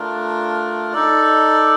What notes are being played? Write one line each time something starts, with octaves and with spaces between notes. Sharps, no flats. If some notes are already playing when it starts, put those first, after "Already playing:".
Already playing: A3 D4 F4 A#4
D#4 A4 D5